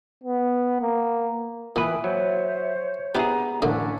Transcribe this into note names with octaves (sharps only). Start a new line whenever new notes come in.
B3
A#3
A#2 E3 B4 E5 G5 G#5 D#6
F#3 C5 C#5
B3 D4 E4 G4 G#4 A#5
A1 D3 A3 A#3 C#4 D4 E4